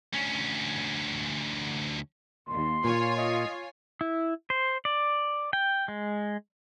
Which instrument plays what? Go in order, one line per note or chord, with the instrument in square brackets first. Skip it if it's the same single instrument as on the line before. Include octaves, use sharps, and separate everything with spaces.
[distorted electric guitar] D2 C#4
[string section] D#2 [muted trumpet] C6
[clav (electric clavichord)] A#2 [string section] F4 C#5 G#5
[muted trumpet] D#5
[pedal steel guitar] E4
C5
D5
G5
G#3